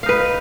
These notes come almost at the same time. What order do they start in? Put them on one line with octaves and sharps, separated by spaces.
F5 D#4 B4